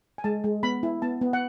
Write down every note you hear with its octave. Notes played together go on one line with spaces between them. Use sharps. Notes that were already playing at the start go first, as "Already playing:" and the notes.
G#5
G#3 A5
G#3
B3 B5
E4
B3 A5
B3
F#5